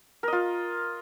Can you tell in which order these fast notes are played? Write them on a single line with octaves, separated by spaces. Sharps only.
A#4 D#5 F4